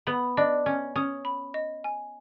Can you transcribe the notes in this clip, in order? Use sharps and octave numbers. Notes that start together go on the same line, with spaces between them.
B3 B5
D4 D#5
C#4 G#5
C#4 D#6
B5
D#5
G#5